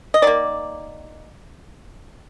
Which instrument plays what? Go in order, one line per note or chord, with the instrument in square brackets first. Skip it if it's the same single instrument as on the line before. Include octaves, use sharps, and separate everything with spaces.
[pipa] D#5
D#3 A#3 D5